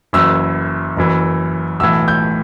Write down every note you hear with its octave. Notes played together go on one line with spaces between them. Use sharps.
F#1 F#2 E3 E6
F#1 F#2 E3
B1 A2 E3 E6
G6